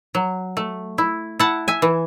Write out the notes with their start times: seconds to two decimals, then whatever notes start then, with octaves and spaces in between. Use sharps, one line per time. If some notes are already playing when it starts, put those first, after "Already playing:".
0.15 F#3
0.57 A3
0.98 E4
1.39 E4 F#5 A5
1.68 E5 G#5
1.82 E3